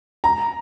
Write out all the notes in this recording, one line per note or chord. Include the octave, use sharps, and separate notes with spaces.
A#5